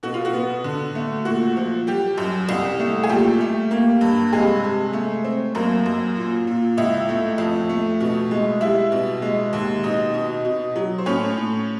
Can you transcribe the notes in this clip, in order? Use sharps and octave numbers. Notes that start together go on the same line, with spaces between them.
B2 F#4
F4
F#4
B3
D3
A3
A#2 F#4
F3
G3 G4
F#2
C2
A3
G#4
A#2 G3 G4
A3
A#3
G2
C3 G#3 G#4
C3
A3
C4
F#2 A#3 A#4
F#2
A#2
A#2
C#2 E4 E5
A3
F2
A3
B2
G#3
G3 E4 E5
B2
G#3
D#2
B2 D#4 D#5
B2
B2
F#3
C5
A2 C#4 C#5
A2